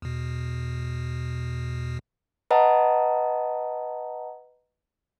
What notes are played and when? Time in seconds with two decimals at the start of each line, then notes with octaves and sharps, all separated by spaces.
0.02 E2 B2
2.51 B4 D#5 F#5 A5 A#5